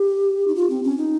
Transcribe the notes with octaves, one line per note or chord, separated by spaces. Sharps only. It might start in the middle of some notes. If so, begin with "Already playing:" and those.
Already playing: G4
D#4
F4
C4
C#4
D#4